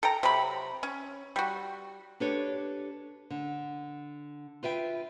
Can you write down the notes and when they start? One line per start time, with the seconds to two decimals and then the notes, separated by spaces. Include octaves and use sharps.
0.03 A4 G5 A#5
0.23 C3 F#3 B5
0.83 C#4
1.36 G3 F#4
2.20 D4 G4 A4 B4 C#5
3.30 D3
4.63 F4 B4 E5 G5